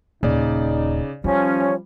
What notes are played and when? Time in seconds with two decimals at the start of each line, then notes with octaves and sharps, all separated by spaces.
0.23 D#1 C#3 D#4 D5
1.24 D#3 F3 G3 C#4